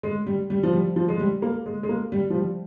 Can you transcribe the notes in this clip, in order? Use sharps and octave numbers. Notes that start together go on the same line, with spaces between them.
G#3
G3
G3
F3
G3
F3
G#3
G3
A#3
G#3
G#3
A#3
G3
F3
G3